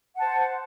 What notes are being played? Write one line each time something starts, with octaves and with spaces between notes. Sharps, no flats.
C5 F#5 A5